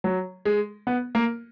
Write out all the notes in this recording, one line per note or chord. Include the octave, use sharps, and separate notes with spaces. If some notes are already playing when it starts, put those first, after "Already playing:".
F#3
G#3
B3
A#3